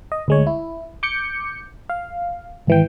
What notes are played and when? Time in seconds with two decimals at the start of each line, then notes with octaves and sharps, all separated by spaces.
0.12 D#5
0.28 D2 G#3 C#5
0.47 E4
1.03 D6 G6 C#7
1.89 F5
2.67 G#1 E3 G5